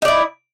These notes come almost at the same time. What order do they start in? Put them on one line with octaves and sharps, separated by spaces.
D#4 D5 E4